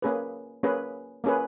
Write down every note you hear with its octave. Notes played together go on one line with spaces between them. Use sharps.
A#3 C#4 G#4 B4
A#3 C#4 G#4 B4
A#3 C#4 G#4 B4